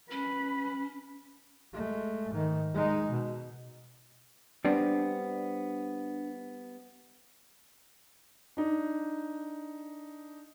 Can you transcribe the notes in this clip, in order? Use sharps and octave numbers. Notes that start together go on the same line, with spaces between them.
C#4 B4 B5
G#3 A3
G#2 D#3
G#3 D#4
B2
G3 B3 C4 D4
D4 D#4